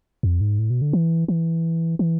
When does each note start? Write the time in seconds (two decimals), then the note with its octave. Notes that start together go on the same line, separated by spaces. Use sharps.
0.23 F2
0.41 G#2
0.59 A2
0.70 B2
0.82 D3
0.93 E3
1.28 E3
1.99 E3